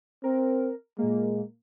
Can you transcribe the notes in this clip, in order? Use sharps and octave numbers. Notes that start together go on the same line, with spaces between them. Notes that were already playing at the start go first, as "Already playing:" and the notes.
C4 A#4
A#2 G#3 A#3